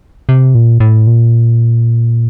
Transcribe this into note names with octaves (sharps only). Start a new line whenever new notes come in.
C3
A#2
A2
A#2